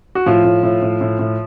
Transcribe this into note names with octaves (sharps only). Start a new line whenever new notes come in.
F#4
A2 F3 F4
A2
A2
A2
A2
A2